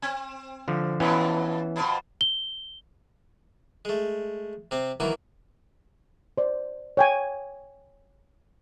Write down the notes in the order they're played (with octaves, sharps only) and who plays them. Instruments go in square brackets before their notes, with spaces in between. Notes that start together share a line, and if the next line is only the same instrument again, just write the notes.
[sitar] C4
[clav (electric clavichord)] D3 F3
[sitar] F2 B2 [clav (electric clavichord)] E3 B3 C#4
[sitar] F2 B2 C5
[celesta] G7
[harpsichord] G#3 A3
C3 C4
D#3 E3 F#3 A#3 E4
[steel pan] C5 D5
C#5 G5 G#5